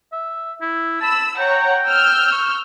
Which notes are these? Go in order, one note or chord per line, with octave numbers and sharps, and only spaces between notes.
E5
E4
A5 B5 E6
C#5 F#5 G5 A#5
E6 F6 G6
C#6